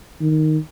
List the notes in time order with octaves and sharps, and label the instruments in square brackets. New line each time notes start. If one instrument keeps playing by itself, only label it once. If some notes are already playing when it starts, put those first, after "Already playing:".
[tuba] D#3